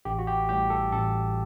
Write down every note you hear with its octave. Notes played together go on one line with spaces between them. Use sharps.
A1 G4
F#4
G4
A2 G3 G4
A4
A1 A4